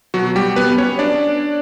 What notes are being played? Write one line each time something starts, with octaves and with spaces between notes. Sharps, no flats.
B2 F#3 F#4
G3 G4
B3 B4
C#4 C#5
D4 D5